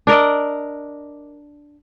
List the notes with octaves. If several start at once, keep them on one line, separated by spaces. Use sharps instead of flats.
D4 A#4 D5 D#5